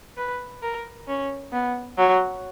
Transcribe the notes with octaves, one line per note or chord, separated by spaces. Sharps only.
B4
A#4
C#4
B3
F#3